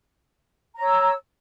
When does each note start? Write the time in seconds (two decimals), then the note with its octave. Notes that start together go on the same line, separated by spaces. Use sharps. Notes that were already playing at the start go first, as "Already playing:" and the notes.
0.75 A#5
0.79 C#5
0.83 E6